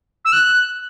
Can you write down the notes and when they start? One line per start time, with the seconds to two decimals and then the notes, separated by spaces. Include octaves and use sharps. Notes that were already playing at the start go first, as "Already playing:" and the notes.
0.25 E6
0.33 F#6